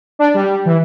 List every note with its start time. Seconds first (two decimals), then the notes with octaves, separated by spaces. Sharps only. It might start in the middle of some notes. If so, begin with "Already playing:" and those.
0.19 D4
0.34 G3
0.66 E3